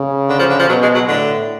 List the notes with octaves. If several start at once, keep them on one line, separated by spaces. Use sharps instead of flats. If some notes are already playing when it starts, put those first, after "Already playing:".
Already playing: C#3
D3
F3
D3
F3
B2 F#3
G#3
F#3
A2 D3